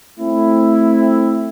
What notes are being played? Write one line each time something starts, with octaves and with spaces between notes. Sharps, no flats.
A3 C4 E4